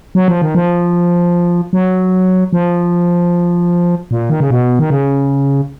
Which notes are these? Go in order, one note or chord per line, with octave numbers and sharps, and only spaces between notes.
F#3
F3
D#3
F3
F#3
F3
A#2
D#3
C#3
B2
D#3
C#3